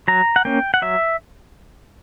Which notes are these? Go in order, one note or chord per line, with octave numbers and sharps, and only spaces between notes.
F#3 A#5
F#5
A#3 C#4 G5
F#5
F#3 E5